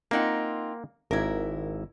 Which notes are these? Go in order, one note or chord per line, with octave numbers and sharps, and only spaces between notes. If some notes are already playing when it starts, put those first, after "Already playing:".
A#3 C4 D#4 F4 F#5
G#1 E4 A#4